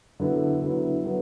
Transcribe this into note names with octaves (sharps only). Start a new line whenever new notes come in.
D3 F#3 B3 E4
D3 F#3 B3 E4
D3 F#3 B3